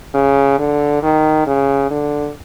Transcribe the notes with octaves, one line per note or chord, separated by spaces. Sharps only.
C#3
D3
D#3
C#3
D3